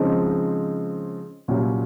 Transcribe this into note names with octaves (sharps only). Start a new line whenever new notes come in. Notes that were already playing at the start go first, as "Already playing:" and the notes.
Already playing: C#3 F3 G#3 C4 D#4
C2 A#2 F#3 C#4